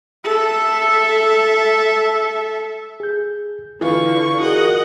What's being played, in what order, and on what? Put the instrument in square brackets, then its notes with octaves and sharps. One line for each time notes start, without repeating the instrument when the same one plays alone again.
[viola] A4 E5
[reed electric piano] G#4 G6
[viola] D3 C#6 [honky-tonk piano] E3 F4 [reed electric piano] E4 B4
[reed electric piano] F#4 G#4 A#4 [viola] D#5 F#5